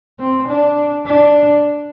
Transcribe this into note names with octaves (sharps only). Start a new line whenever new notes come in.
C4
D4
D4